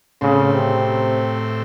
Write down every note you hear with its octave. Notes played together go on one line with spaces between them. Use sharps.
A2 C#3 C4
C3